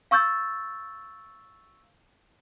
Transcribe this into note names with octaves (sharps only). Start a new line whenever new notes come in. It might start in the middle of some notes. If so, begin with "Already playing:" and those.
F5 C#6 E6 G6 A6